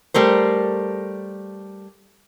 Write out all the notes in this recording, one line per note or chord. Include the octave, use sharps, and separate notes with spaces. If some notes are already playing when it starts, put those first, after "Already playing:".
G3 A3 A#4 C5